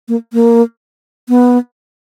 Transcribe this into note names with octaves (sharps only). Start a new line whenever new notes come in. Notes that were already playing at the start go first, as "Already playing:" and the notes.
A#3
A#3
B3